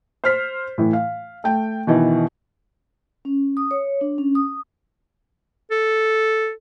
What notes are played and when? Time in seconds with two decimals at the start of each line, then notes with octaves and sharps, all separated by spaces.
0.24 C5 F6 B6
0.78 A2 E3
0.93 F5
1.44 A3 G5
1.87 B2 D#3 E3
3.25 C#4
3.57 D#6
3.71 C#5
4.01 D4
4.18 C#4
4.35 D#6
5.71 A4